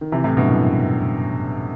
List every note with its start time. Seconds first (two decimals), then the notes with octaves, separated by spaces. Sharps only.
0.01 D#3
0.12 C3 E3
0.24 A2 C3
0.37 G2 B2
0.48 F#2 A2